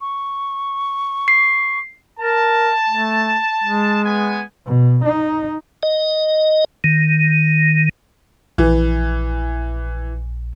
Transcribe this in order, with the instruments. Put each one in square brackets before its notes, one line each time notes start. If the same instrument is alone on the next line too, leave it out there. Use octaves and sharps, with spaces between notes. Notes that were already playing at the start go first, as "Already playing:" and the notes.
[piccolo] C#6
[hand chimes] C7
[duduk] A#4 [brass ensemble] A5
[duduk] A3
G#3
[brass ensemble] B3 G#5
[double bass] B2
D#4
[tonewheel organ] D#5
D#3
[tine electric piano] A#1 [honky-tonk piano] E3